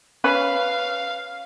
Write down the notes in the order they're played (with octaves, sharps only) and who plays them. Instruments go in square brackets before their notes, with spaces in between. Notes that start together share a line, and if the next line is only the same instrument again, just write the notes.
[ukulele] C#4 B4 B5 [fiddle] F5